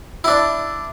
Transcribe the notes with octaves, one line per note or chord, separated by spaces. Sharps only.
D4 E4